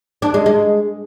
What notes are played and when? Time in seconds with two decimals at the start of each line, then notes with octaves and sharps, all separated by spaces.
0.22 D4
0.34 G#3
0.46 G#3